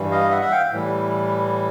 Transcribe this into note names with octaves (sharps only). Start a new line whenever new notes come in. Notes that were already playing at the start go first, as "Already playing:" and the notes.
Already playing: G2 E3 G3
D#5 F5
E5 F#5
E5 F#5
F5 G5
A2 E3 G3